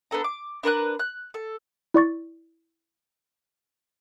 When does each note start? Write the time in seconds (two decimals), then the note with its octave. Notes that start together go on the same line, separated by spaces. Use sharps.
0.11 B3 D4 A4 A#5
0.24 D6
0.63 D4 A#4 B4 F#6
0.99 F#6
1.34 A4
1.94 E4 D5 C#6 A6